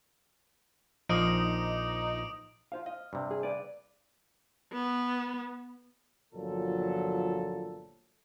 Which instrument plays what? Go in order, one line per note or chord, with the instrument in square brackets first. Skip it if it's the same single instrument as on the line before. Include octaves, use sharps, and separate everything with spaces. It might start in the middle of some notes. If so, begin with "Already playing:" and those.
[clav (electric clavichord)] A#1 F3 [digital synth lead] D#4 [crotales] D6 D#6 D7
[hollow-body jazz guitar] F4 C5 F5
[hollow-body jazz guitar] D#5 [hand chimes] F5
[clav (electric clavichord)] G2 C3
[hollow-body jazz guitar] G#4
B4 D5
[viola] B3
[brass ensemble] G1 A#2 F3 F#3 A4